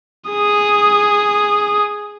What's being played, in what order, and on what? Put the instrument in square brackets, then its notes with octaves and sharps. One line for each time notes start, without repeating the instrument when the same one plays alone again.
[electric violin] G#4 D#6